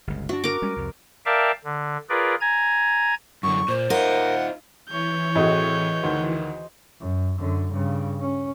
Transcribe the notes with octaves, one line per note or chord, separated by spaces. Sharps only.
G1 C#2
G2 D4 F#4
A#4 D6
G3 G#3 C#4
C2 F2
A#4 D5 E5 F5 G5 A5
D3
F4 G#4 A#4 B4 D5
G#5 A#5 G#6
F#2 D3 C#6
A#2 C5
D#4 F4 A#4 F#5
E3 C#5 G6
A2 A3 C4 F#4 G#4 D#5
D2 D#3 C5
F#2
F#2 D3
G2 C#3
C#4